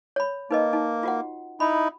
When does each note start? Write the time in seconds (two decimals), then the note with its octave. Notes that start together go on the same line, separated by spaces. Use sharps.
0.16 C#5 B5
0.51 A#3 D#4 B4 D#5
0.73 D#4
1.03 F4 F#4 F#5
1.60 D#4 E4 B5